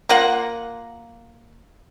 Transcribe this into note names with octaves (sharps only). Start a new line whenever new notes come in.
A#3 F4 F#5